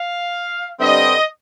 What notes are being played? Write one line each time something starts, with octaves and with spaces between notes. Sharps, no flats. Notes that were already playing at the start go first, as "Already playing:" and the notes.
Already playing: F5
G2 D3 G3 C4 D#5